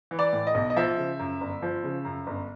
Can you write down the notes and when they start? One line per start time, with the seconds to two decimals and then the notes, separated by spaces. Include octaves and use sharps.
0.11 E3
0.19 D5
0.33 A2
0.47 D#5
0.55 B1
0.70 D#5
0.76 F3 E5
0.97 C#3
1.19 F#2
1.41 G1
1.62 F3
1.84 C#3
2.05 F#2
2.27 G1